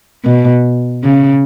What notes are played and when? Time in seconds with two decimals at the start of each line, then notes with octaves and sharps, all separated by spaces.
0.25 B2
1.04 C#3